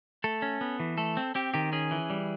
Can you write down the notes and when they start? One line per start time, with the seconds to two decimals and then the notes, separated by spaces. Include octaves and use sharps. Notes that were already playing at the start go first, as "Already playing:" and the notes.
0.24 A3 A4
0.42 C#4
0.61 B3
0.80 E3
0.98 A3 A4
1.17 C4
1.35 C4 G4
1.54 D#3 G4
1.73 C#4 G#4
1.91 E3
2.10 G3